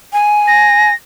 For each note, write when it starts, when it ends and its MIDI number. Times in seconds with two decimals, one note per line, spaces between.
0.13 0.90 80
0.47 0.94 94